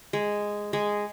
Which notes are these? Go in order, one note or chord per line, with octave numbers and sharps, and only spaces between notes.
G#3
G#3